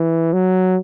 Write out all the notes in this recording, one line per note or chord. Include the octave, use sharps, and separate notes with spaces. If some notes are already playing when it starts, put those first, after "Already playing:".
Already playing: E3
F#3